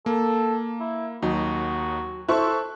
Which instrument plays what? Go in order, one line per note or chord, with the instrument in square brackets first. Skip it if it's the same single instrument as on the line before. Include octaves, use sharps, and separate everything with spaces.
[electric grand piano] A#3 [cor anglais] A4
[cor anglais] E4
[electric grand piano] D#2 D#4 [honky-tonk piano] F#3 [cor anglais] F#4
[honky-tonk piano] E4 C5 C#6 [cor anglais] A4 [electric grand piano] E6 F#6